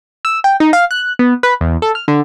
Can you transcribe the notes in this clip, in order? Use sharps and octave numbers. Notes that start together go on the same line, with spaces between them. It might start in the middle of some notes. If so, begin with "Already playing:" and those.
E6
G5
D#4
F5
F#6
B3
B4
E2
A4
F6
D3